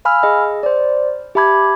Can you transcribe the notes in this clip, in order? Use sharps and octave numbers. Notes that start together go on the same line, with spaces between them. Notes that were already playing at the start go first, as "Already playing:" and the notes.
F5 G#5 B5 E6 F6
G#4 D#5
C5 D5
G4 E5 A5 B5 D6 G#6